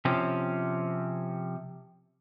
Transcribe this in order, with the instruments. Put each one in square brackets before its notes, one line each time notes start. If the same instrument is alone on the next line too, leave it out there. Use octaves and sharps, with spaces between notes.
[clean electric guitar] C3 F3 C4 C#4